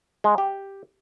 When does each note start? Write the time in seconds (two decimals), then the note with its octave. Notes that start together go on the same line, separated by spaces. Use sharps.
0.24 G#3
0.38 G4